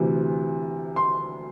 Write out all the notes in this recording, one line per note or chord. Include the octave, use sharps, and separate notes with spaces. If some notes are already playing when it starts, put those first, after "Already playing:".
Already playing: D2 C3 E3
C6